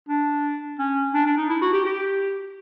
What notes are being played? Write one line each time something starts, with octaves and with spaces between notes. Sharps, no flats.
D4
C#4
D4
D4
D#4
E4
F#4
G4
G4